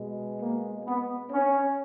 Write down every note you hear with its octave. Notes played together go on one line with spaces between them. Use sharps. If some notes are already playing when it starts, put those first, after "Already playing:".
Already playing: B2 G#3
A#3
B3
C#4